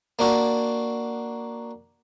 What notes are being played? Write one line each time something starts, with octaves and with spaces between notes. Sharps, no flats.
A#3 D4 F#4